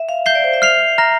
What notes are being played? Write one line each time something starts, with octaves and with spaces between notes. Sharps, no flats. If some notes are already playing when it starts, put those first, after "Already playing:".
Already playing: E5
F5
E5 G6 C7 G7
D5
C5
E5
F6 C7 F7
A#5 F6 A#6